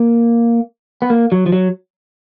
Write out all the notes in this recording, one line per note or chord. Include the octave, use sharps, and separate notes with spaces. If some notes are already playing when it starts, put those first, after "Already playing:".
Already playing: A#3
B3
A#3
F#3
F3
F#3